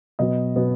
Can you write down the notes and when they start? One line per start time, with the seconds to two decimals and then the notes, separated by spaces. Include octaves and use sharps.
0.19 B2 F#3 B3 D#5
0.56 B2 F#3 B3